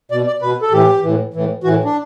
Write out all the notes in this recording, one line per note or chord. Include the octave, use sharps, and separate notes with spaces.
B2 D5
D5
B2 B4
A4
A2 E3 G4
A2 E3
A2 E3
A2 E3 F#4
D4